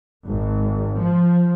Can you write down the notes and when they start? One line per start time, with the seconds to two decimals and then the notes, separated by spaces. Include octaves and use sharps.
0.26 G#1
0.99 F3